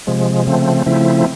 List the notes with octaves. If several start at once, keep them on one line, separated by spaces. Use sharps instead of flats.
C3 F3 G#3
C#3 F3 A3 C4
C#3 F3 A3 C4 E4